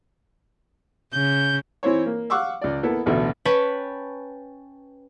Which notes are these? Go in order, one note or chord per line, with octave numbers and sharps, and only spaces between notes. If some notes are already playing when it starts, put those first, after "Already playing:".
C#3 G6
E3 C4 E4 C5 C#5
A#3
F5 F#5 C#6 D6 E6
C#2 D5
A#3 B3 E4 A4
A1 D2 B2 A4
C#4 B4 C#5 G5 A5 B5